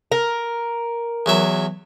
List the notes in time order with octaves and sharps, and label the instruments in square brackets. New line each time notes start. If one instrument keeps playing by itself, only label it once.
[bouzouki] A#4
[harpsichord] E2 F#3 E5